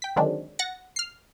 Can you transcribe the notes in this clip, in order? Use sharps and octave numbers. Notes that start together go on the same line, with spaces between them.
G5 B6
D3 D#3 F#3 G#3 C4 D4
F#5 A6 A#6 C#7
F6 C7